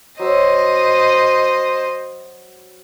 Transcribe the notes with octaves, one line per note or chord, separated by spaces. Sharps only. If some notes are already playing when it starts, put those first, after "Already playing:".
F#3 C5 D#5 E6